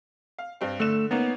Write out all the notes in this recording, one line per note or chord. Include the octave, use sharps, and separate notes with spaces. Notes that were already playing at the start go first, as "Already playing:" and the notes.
F5
G2 C4
D3 A3 E7
A#3 B3 C#4 D#4